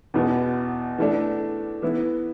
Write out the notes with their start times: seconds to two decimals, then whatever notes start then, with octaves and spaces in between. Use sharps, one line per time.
0.14 E2 B2 B3
0.98 E3 A3 D4
1.82 E3 B3 E4